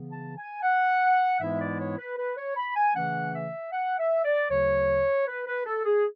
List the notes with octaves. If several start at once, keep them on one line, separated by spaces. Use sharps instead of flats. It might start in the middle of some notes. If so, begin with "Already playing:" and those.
Already playing: C#3 E3 B3
A5
G#5
F#5
G#2 E3 G#3 B3 E4 E5
D5
C#5
B4
B4
C#5
B5
G#5
C#3 E3 A3 C#4 F#5
E5
F#5
E5
D5
D2 C#3 F#3 C#5
B4
B4
A4
G#4